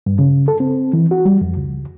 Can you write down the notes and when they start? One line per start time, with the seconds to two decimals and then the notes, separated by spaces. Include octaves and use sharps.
0.06 G2
0.19 C#3
0.48 A4
0.60 C4
0.93 E3
1.11 F#4
1.25 G3
1.41 F2
1.57 C#2